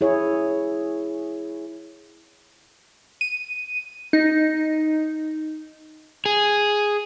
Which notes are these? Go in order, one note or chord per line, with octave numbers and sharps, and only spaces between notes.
E4 G#4 C#5
D#7
D#4
G#4